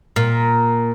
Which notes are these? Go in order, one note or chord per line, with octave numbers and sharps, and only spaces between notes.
A#2